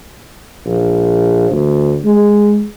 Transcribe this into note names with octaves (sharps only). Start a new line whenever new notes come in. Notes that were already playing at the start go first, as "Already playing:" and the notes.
A#1
D2
G#3